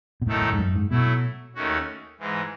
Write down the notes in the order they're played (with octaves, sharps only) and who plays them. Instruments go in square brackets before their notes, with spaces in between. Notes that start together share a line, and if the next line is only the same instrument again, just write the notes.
[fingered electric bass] B2
[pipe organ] F#2 D#3 A3 D#4 A4 [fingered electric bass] A2
[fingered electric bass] A2
G#2
F#2
G#2
[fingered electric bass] B2 [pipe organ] F#3 A3 E4
[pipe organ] D#2 D#3 A3 C#4 F#4
G#2 E3 G#3